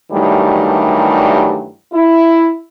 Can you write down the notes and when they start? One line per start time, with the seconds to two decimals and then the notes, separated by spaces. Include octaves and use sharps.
0.12 G2 D#3 E3 F#3 G3 A3
1.94 E4